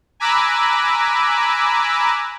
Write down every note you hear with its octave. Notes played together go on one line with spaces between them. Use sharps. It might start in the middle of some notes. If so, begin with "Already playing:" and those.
G#5 A#5 B5 D6 E6 F#6